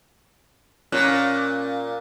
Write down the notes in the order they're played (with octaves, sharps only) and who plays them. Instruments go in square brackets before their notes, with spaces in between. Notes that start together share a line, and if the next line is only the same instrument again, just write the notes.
[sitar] A#2 [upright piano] C#4 F#6